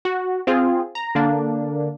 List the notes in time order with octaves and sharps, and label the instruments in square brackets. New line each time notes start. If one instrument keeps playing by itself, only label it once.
[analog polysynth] F#4
C4 F4 G#4
A#5
D3 A#3 D4